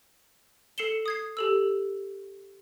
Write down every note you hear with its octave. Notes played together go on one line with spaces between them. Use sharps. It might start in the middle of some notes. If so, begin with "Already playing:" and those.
A4 C7 C#7 E7 G7
D#6 G#6 C7
G4 A4 E6